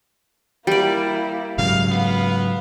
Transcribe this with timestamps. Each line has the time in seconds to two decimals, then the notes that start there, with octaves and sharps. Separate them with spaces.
0.67 G3 A#3 E4 D5
1.58 G#2 C#3 F#3 F5
1.91 B3 F5